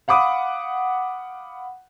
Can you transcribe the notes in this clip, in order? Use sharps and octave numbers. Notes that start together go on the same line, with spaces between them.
F5 F#5 B5 D6 D#6